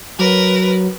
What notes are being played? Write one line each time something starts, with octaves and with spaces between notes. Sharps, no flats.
F#3 A#4 B4